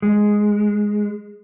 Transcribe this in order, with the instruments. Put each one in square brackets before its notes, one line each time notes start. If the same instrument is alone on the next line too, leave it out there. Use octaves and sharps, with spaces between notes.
[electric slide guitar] G#3